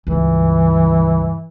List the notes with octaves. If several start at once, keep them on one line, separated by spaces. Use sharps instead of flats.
C#2 G2 E3